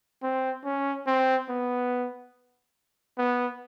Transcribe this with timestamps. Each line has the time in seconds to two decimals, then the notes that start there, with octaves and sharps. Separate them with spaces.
0.22 C4
0.64 C#4
1.07 C4
1.49 B3
3.18 B3